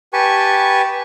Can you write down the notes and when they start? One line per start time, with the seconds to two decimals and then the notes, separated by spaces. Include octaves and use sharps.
0.13 G4 B4 G#5 A5 C#6